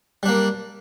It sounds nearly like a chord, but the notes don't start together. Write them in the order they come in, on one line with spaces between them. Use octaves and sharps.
G3 D4 A#3